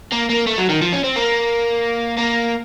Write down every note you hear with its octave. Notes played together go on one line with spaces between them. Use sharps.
A#3
A#3
A3
F#3
D#3
F3
C#4
C4
A#3
A#3